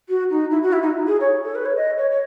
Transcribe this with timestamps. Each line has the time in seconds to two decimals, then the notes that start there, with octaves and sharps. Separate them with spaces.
0.09 F#4
0.30 D#4
0.51 E4
0.62 F#4
0.73 E4
0.82 D#4
1.07 G#4
1.20 C#5
1.45 A4
1.55 B4
1.66 C#5
1.77 D#5
1.98 C#5
2.11 C#5